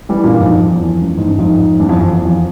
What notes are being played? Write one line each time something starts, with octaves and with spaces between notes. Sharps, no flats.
E3 G3
G2 A#2
F2 G#2
F2
E2
F2
E2 G2
G#2
G2
F2 G#2
E2 G2
F2
F2
E2
F2